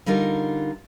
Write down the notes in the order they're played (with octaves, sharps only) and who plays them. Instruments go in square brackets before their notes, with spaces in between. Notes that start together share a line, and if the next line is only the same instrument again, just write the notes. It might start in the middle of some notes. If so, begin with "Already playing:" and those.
[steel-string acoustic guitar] D3 G3 D#4 F4 A#4